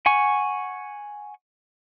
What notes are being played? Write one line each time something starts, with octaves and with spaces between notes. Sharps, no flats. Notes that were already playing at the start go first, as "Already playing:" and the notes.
F#5 G#5 C#6